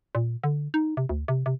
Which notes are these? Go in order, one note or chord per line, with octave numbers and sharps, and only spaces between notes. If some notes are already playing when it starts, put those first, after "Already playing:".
A#2
D3
D#4
C3
D2
C3
C3